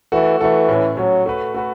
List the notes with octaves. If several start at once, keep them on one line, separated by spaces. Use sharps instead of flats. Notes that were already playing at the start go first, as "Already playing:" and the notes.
E3 A3 F#4 A4
E3 A3 F#4 A4
A2 A3 C#4
A2 F#3 A3 C#4
A3 F#4 B4
A3 F#4 B4